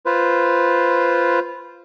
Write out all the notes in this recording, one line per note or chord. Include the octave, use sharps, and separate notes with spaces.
F4 B4 C5